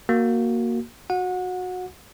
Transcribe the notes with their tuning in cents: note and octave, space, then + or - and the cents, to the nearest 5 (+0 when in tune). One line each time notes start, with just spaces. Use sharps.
A#3 +0 F#4 +5
F#4 -15 F#5 -25